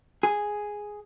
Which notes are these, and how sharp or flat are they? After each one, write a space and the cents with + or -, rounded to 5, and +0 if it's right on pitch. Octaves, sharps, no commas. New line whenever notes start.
G#4 +0